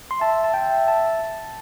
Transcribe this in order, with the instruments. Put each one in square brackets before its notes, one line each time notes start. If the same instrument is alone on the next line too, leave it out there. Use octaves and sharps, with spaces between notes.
[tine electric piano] C6
[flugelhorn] E5 [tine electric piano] A5
[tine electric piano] A5
[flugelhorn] E5 [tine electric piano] G5
[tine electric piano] A5